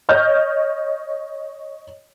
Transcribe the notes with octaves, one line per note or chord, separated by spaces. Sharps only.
C#5 D#5 F6 G6